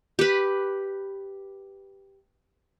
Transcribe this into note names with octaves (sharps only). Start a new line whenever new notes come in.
G4 B4